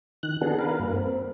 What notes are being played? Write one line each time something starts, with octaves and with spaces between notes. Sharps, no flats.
D#3 F#6
D#3 B3 D4 F#4 G#4 A4
A#4 B4 F5
G2 A#3
C4